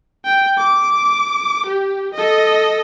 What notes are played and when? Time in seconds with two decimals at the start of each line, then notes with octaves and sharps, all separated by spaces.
0.24 G5
0.58 D6
1.66 G4
2.14 A4 D#5